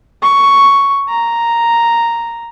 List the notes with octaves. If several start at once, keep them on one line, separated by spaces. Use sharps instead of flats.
C#6
A#5